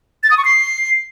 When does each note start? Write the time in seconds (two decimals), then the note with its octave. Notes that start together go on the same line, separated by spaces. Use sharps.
0.23 A6
0.31 D#6
0.38 C#6
0.45 C7